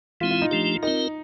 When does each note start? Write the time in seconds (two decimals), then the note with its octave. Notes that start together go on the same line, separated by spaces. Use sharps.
0.21 E3 G#3 C4 E4 F4
0.31 F4
0.42 D#4
0.51 F3 A3 D4 G4
0.83 C4 D#4 F4 A#4